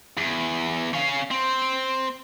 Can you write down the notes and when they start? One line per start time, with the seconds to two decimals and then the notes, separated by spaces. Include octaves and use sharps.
0.17 E2
0.93 C#4 F5
1.31 C4